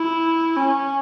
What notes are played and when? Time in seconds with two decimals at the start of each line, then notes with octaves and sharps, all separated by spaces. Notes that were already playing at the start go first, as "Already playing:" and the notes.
Already playing: E4
0.56 C#4